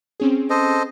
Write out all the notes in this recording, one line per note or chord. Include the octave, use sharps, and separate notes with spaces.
C4 C#4 G#4
A4 C5 D#5